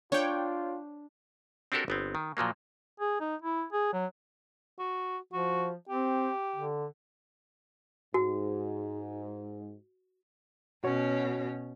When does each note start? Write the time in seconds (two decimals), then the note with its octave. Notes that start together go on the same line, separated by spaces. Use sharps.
0.12 D4 F4 C#5 G5
1.72 C4 D4 F#4 G4 A4 A#4
1.88 G1 B3 C4
2.15 D#3
2.37 A#2 F3 F#3 A#3
3.00 G#4
3.20 D#4
3.42 E4
3.72 G#4
3.93 F#3
4.79 F#4
5.33 F3 F#4
5.89 C4 G4
6.56 D3
8.14 G#2 F#4
10.84 B2 C#4 F#4 C#5